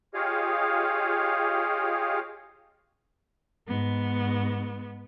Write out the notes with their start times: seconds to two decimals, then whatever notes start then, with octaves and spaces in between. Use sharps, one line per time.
0.14 F4 G4 G#4 C#5 D#5 F5
3.68 G#2 B3